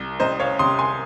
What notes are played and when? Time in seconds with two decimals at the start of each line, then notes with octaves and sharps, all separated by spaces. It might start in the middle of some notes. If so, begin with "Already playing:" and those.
Already playing: C2
0.20 C2 C5 D#5
0.40 C#5 F5
0.59 C3 C6 D#6
0.79 G#5 C6